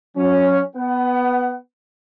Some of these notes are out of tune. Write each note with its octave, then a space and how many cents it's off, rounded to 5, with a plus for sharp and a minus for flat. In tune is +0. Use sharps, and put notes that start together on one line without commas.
F#3 -35 C#4 +0
B3 +0 F#5 +30